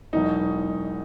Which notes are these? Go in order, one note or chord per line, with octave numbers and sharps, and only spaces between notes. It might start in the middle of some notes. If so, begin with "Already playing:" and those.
E1 E2 B2 F#3 D#4